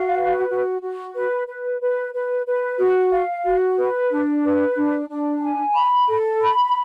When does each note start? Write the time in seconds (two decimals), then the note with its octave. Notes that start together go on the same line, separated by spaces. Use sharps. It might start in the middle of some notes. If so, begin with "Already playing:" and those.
Already playing: F#4 F5
0.17 B4
0.50 F#4
0.82 F#4
1.15 B4
1.47 B4
1.81 B4
2.14 B4
2.46 B4
2.79 F#4
3.12 F5
3.45 F#4
3.77 B4
4.10 D4
4.43 B4
4.76 D4
5.09 D4
5.42 G#5
5.74 B5
6.08 A4
6.40 B5